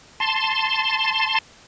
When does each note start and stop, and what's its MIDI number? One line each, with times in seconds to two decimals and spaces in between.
0.20 1.39 81
0.20 1.39 84